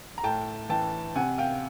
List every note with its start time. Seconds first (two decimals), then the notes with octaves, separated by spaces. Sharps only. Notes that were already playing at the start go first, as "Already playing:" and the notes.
0.18 A#5
0.23 A2 G5 A5
0.69 E3 G5 A5
1.15 C3 F#5 G#5
1.38 F5 G5